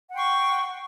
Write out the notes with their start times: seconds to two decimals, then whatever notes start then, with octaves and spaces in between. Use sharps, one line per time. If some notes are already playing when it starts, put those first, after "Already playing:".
0.10 F#5
0.12 G5
0.15 C6
0.17 C#6